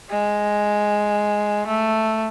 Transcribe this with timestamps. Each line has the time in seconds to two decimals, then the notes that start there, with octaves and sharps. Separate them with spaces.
0.10 G#3
1.67 A3